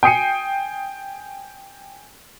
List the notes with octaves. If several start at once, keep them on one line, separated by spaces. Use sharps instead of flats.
G5 G#5 D#6 C7 C#7 D#7